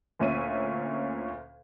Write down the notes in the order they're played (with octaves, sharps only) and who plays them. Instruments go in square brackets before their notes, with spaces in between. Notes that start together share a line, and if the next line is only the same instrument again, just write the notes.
[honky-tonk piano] D2 A#2 C#4 E5 D#7